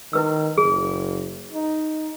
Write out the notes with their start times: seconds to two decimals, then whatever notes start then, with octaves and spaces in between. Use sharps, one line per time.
0.13 D#3 E4 B4 E6
0.58 F#1 G#4
1.53 D#4